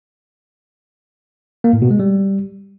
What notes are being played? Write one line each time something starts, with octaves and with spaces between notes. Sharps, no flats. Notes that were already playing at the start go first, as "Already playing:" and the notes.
A#3
A2
B2
G#3
G3